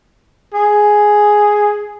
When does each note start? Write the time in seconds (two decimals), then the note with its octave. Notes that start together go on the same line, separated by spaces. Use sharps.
0.54 G#4